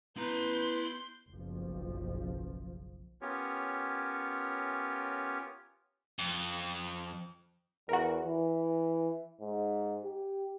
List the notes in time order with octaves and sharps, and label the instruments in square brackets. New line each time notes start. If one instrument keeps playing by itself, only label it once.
[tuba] B3 [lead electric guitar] E4 A#5 [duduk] B4 [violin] C6 G6
[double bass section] F#1 B1 F3
[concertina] B3 C#4 F4 G4 A#4 C#5
[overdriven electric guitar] F2
[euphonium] E2 [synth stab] F#4 A#4
[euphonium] E3
G#2
G4